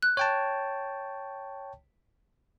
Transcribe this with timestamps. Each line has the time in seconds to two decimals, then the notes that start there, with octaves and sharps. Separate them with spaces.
0.03 F#6
0.17 C#5 G5 A5